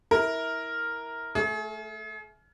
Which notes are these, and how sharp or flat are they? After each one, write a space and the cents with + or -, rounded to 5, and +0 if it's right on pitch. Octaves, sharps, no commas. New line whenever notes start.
E4 -25 A#4 +0
A3 +0 G#4 +40